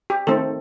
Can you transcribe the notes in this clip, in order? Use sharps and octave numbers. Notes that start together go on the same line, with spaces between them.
G4
D#3 A3 C4 A4